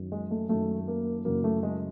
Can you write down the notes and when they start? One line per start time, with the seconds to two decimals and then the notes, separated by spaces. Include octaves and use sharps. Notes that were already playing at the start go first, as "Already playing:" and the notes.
Already playing: F#2 D#3
0.12 G#3
0.31 A3
0.49 F#2 D#3 A3
0.88 A#3
1.25 F#2 C#3 E3 A#3
1.44 A3
1.63 G#3